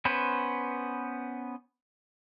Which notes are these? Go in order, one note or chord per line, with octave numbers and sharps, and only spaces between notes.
B3 C#4 B4 C5